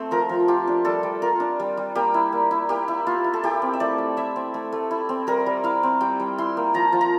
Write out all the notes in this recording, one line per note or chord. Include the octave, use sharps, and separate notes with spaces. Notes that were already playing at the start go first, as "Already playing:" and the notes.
Already playing: A3 C4 C5
F3 A#4
F3
F4 G4
D4
G3 A4
G3
F4 A#4
D4
G3
G3
A#3 G4
E4
A#3
E4
A#3 G4
E4
A#3 F4
E4
A4
E4 G4
C4
E5
A3 D5
A3
E4 E5
C4
A3
A3
E4
C4
G3 A#4
G3
E4 F5
C4
G3 G5
G3
E4 C6
A#3
F3 A#5
F3
A#5